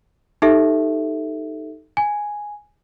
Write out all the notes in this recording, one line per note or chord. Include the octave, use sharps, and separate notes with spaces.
D#4 G4 A4 E5
G#5